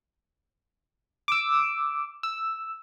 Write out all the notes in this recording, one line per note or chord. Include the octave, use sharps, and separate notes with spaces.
D6 E6
E6